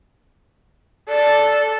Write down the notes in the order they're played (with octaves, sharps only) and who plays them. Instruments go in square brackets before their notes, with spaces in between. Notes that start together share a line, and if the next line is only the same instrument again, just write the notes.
[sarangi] A4 [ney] D5